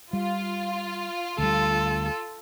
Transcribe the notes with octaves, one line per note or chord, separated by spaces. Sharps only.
G3 F4
D2 G3 A4